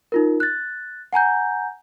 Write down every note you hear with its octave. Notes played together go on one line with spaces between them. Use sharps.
D#4 F4 A#4
F#6 A6
F#5 G#5 A#5 G6